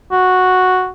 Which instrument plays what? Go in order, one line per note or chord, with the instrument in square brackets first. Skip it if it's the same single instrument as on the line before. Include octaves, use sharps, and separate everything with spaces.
[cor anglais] F#4